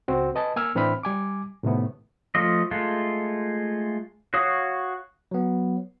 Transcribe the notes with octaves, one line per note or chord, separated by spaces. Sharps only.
C#2 C4 F#4
B4 D#5 G#5 A5
A#3 G#5 E6 F6
A2 E3 C4 D4 B5 F6
G3 G#5 D6
A2 C3 D#3 A3 B3
F3 A3 F4 D#5
G#3 A3 F4
F#4 C#5 F5 D#6
F#3 B3